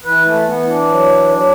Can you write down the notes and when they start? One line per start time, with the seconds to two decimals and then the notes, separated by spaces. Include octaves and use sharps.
0.04 E3 B4
0.25 A3
0.47 E3 B3
0.68 D4
0.89 F#3
1.31 F#3